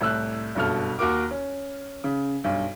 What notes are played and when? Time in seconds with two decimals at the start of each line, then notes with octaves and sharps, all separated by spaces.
0.01 C2 A2 A3 E6 F#6
0.55 F#1 G2 B2 A4 F6
0.99 D#2 F#4 A#4 D6
1.31 C#4
2.04 C#3
2.44 B1 G2